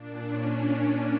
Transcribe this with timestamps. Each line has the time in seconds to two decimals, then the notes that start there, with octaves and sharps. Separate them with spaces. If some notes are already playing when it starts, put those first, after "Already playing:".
Already playing: A#2 D4
0.27 C#4